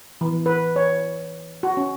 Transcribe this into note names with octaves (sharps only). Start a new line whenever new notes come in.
E3
B4
C#5
F#4
C#4